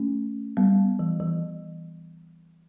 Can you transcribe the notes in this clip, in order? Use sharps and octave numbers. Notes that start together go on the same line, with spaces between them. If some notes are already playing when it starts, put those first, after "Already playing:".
Already playing: A3 C#4
G3 B3
E3
E3